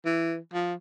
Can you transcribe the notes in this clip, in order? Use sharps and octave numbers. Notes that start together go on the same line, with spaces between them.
E3
F3